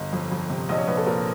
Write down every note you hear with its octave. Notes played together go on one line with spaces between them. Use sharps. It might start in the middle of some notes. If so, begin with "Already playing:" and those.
Already playing: G1 D#5
F2
F2
C3
A#1 D#5
C#5
A#1 B4
A4
A#2 A#4